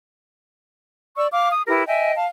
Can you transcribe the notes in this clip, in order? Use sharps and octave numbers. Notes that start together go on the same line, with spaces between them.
D5 C#6 E6
F5 D6 F6
D#6
E4 G4 A#4 B4
D#5 E5 G5 G#5
F5 A5